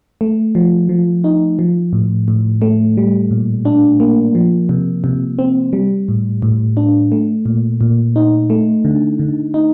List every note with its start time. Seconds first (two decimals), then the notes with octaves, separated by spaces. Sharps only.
0.21 A3
0.55 F3
0.89 F3
1.24 D#4
1.59 F3
1.93 A2
2.28 A2
2.62 A3
2.97 G3
3.31 A#2
3.65 D4
4.00 A#3
4.35 F3
4.69 C3
5.04 C3
5.39 C4
5.73 G3
6.08 A2
6.42 A2
6.77 D4
7.12 A3
7.46 A#2
7.81 A#2
8.16 D#4
8.50 A3
8.85 D3
9.19 D3
9.54 D#4